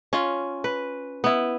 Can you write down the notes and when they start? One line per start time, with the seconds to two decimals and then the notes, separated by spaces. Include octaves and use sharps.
0.13 C#4 F4
0.64 B4
1.24 B3 E4